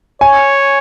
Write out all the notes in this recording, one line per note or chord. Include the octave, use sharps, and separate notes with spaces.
C#5 G#5